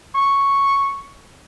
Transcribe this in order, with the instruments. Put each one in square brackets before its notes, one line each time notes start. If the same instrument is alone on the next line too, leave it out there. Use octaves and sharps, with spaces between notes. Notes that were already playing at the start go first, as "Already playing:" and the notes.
[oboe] C#6